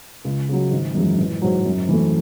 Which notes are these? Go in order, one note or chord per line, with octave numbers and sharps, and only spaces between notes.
C#2
C#3 F#3
G#1
F#2 E3 G#3
A1
G#2 F#3
F#2
E3 A3